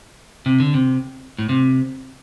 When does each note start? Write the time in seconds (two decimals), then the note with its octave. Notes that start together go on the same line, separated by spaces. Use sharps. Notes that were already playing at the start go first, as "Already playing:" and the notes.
0.46 C3
0.60 D3
0.74 C3
1.39 A2
1.49 C3